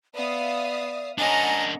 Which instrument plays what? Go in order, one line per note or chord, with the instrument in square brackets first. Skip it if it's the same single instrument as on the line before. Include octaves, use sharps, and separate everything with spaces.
[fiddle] B3 [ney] D5 [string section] E5 F5 D#6
[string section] G#3 C#4 F#5 [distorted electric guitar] D4 A#4 [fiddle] D#5 A#5 [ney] G#5